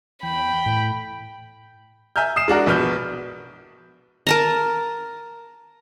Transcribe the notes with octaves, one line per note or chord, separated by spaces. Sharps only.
E2 G5 B5
A2
E5 G#5 A#5 F6 G6
D#6 C7 E7
G#3 D4 F#4 A#4
A#1 B2 B4 F6 G6
A#4 A5 A#5